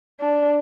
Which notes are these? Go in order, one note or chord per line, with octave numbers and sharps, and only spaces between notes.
D4